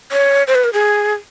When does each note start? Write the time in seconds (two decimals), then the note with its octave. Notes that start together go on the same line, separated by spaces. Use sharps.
0.11 C#5
0.47 C5
0.55 B4
0.64 A#4
0.73 G#4